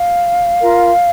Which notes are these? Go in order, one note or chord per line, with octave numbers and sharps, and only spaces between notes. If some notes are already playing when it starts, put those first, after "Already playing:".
Already playing: F5
F4 A#4